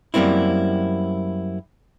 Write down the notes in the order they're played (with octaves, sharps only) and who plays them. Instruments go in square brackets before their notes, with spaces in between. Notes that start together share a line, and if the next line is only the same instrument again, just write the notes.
[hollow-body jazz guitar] F#2 G3 A#3 C4 E4